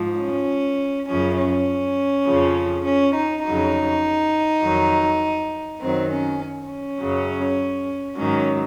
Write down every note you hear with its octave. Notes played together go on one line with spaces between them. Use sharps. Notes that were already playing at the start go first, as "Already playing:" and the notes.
Already playing: G#2 F3
C#4
F#2 C#3 F3 C#4
C#4
F2 C#3 F3
C#4
D#4
F2 C#3 F#3 D#4
F2 D#3 F#3
F#2 D#3 F#3 C4
C#4
C#4
F#2 C#3 F#3
G#2 D#3 F#3 C#4